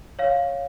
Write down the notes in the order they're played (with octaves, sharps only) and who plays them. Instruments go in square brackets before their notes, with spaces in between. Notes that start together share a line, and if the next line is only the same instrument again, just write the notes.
[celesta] C#5 F5